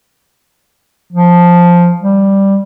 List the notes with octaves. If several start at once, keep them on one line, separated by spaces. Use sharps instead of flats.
F3
G3